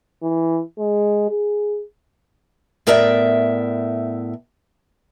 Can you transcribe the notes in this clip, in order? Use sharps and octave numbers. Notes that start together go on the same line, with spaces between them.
E3
G#3
G#4
A2 B3 A#4 D5 E5